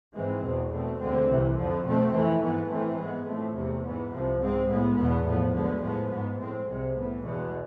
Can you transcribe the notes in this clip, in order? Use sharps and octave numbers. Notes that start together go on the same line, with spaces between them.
G#2 E3 G#3 C4
E2 B2 G#3
B2 A3 C4
D2 D3 G#3 C4
C2 C3 E3
F2 D3 F3
B2 A3 C4
F2 E3 A3
G#2 E3 B3
A2 E3 A3 C4
G#2 G#3 B3
A2 F3 A3 C4
E2 C3 E3 A3
G#2 E3 B3
C2 C3 F3
G#2 G#3 C4
A2 G#3 B3
E2 B2 B3
A2 F3 B3
D2 D3 G#3 B3
A2 F3 G#3 B3
G#2 G#3 B3
A2 G#3 C4
C2 C3 G#3
A2 E3 B3
E2 B2 G#3